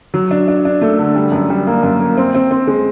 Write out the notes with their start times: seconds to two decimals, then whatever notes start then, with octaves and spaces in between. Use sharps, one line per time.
0.14 F#3
0.31 D4
0.48 D4
0.65 D4
0.81 A3
0.99 D3
1.15 G3
1.32 F#2
1.50 G3
1.67 A#3
1.83 F#2
2.00 A#3
2.17 C4
2.35 C4
2.51 C4
2.67 G#3